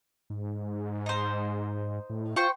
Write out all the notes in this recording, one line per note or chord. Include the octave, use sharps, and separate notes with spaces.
G#2
D#4 C5
A2
F4 C5 G5 C#6